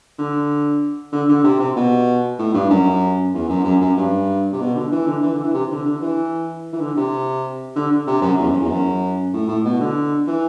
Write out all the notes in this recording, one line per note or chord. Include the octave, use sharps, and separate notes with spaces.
D3
D3
D3
C3
C3
B2
A2
G2
F#2
E2
F#2
F#2
F#2
G2
C3
B2
D3
E3
D3
E3
D3
E3
C3
D3
D3
E3
E3
D3
C3
D3
D3
C3
F#2
E2
F#2
E2
F#2
A2
A2
B2
D3
E3